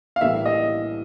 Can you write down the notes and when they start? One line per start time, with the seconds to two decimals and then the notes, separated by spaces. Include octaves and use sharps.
0.16 F5
0.21 B1 A2 E3 G3 A#3 E5
0.45 D#5